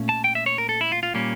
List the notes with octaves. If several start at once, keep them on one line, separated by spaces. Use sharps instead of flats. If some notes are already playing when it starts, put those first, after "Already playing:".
Already playing: A#2 A3 C#4
A5
G5
E5
C#5
A#4
A4
E4
F4
F4
A#2 G3 A#3 C#4